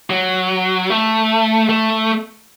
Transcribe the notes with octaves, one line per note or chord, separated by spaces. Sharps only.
F#3
A3
A3